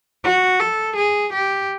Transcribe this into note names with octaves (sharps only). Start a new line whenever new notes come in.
F#4
A4
G#4
G4